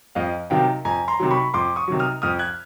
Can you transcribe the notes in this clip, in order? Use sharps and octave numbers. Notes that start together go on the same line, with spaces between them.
F2 D#5 F5
C3 D#3 F#3 F5 G5
F2 G#5 A#5
A#5 C6
C3 D#3 F#3
B5 C#6
F2 C6 D6
C#6 D#6
C3 D#3 F#3
D#6 F6
F2 D#6 F6
F#6 G#6